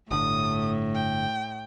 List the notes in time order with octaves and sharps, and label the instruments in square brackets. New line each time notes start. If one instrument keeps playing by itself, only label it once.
[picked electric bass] G1 D3 [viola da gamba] A2 [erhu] D#6
[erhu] G5